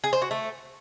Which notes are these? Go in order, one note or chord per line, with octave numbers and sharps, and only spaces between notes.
G#4
C5
F#4
A3